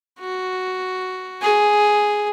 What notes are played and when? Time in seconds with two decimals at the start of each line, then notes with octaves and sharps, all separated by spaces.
0.20 F#4
1.42 G#4